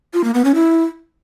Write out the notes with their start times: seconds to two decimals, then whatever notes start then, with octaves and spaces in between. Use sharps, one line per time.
0.14 F4
0.24 A#3
0.34 B3
0.45 C#4
0.55 E4